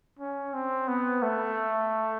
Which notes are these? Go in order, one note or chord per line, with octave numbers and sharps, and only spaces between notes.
C#4
C4
B3
A3